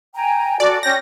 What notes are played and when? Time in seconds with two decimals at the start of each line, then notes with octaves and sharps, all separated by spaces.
0.15 G5 G#5 A#5
0.60 F#4 A4 D5
0.83 C#4 G5 G6 A#6